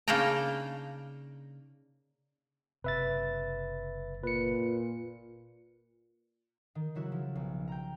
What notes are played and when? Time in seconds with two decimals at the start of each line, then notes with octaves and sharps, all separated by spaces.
0.08 C#3 A#3 D4 D#4 G5 A#5
2.84 F#1 C3 B4 E5 A6
4.24 A#2 B4 C#7
6.75 D#3
6.95 C#3 F#3 E4 F#4
7.12 F3
7.35 B1
7.68 G5 A#5